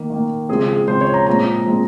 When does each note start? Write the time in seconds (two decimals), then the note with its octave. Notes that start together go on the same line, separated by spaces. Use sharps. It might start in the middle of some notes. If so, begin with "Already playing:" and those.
Already playing: D#3 A#3
0.10 D#3 A#3
0.49 C#3 F3 G#3 C4 G#4
0.68 G#4
0.88 C#3 F3 G#3 C4 C5
1.01 C#5
1.14 A#5
1.27 A#2 F3 G#3 C4 A#5
1.66 A#2 F3 G#3 C4